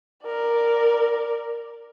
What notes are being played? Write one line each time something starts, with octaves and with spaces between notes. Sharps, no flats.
A#4 D5